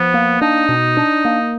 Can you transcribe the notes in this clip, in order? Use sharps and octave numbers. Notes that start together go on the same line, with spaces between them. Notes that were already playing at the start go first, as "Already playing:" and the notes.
Already playing: F3 B3
A#3
D4 D#4
B2
D4
A#3